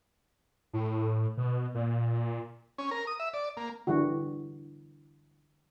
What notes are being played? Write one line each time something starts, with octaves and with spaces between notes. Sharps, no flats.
A2
B2
A#2
C#4
A#4
D#6
E5
D5
A#3
D3 E3 G3 F#4